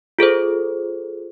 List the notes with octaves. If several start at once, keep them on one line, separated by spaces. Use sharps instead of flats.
F4 G#4 A4 C5